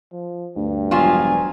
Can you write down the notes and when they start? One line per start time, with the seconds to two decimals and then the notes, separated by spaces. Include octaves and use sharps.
0.13 F3
0.56 D2 G2
0.91 E1 F3 F#3 F4 G#5